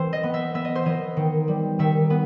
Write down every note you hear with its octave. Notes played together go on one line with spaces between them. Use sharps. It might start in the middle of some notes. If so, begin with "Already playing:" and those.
Already playing: E3 C4 C5
D#5
B3
E5
B3 E5
D#5
C5
E3 D#5
D#3
G3
D#3 E5
B3